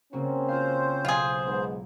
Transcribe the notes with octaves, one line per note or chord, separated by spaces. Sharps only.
C#3 A#3 C4 C#4 F#4
F4 C5 F5
B1 F4 G#4 D#7
G#2 B3